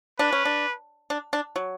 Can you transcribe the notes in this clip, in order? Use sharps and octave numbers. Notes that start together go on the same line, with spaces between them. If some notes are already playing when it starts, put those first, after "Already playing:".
D4 B4
C#4
D4
D4
D4
F#3